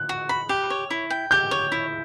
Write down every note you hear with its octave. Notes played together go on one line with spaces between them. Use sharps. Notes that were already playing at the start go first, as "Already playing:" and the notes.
Already playing: F#6
F#4
B5
G4
C#5
E4
G5
G4 G6
C#5
E4